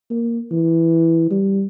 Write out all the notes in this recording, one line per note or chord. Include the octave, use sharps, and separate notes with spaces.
A#3
E3
G3